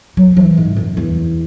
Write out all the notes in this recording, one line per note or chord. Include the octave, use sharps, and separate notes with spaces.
F#3
E3
G#2
F#2
E2